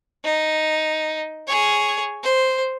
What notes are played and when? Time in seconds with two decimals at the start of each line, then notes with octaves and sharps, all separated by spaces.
0.25 D#4
1.47 G#4 C#5
2.23 C5